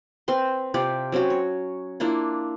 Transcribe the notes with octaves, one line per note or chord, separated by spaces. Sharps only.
C4 B4 C6
C3 F4 G4 D5
F#3 C4 C#4 F#4
C#5
A#3 D4 E4 F4